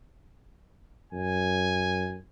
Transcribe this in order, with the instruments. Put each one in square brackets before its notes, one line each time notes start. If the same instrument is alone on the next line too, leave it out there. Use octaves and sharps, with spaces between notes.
[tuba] F#2 [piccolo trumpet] G#5